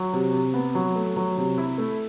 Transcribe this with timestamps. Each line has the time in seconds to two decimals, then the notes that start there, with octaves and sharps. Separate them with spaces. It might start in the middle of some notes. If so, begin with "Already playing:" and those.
Already playing: F#3
0.13 C3
0.33 C3
0.54 B3
0.75 F#3
0.96 A3
1.16 F#3
1.37 C3
1.58 E4
1.78 A3